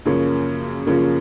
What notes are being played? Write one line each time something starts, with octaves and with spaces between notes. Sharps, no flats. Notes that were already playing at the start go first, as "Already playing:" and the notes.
F#2 C#3 F3 A#3 C#4
F#2 C#3 F3 A#3 C#4